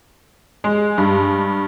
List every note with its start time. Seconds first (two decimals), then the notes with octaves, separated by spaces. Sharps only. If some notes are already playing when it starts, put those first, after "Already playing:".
0.64 G#3
0.98 G2